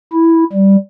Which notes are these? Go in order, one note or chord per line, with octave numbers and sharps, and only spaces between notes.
E4
G3